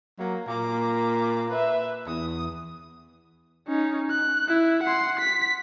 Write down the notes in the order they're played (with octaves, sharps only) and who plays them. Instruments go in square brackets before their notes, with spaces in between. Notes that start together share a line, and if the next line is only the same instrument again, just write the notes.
[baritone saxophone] F#3 [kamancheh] A#3
[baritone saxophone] A#2 [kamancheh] A#3 D6
[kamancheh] B4 E5
[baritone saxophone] E2 [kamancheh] D#6
[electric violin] C#4 D#4
F#6
E4
F#5 C6
B6